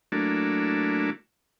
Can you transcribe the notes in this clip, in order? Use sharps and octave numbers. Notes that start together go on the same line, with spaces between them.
F#3 A3 A#3 D4 E4